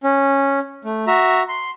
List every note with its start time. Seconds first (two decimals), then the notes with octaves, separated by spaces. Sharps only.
0.04 C#4
0.85 A3
1.07 F#4 E5 A#5
1.49 C6